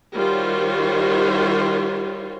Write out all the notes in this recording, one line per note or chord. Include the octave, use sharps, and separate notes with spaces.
D#3 G3 F4 F#4 C5 C#5